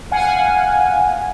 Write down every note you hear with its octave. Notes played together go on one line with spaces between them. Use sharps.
F5 F#5 G#5